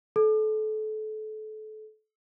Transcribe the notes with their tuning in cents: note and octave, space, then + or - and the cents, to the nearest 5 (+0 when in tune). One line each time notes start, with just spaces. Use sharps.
A4 -30